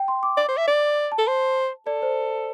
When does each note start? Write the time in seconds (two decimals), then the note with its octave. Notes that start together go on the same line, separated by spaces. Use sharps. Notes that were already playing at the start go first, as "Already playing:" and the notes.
Already playing: G5
0.08 C6
0.23 D6
0.37 D5
0.48 C5
0.57 E5
0.67 D5
1.12 A5
1.18 A4
1.27 C5
1.86 A4 D5
2.02 C5